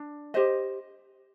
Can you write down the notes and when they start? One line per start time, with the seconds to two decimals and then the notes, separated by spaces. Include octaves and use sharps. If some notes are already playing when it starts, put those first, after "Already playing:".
Already playing: D4
0.34 G4 C5 D#5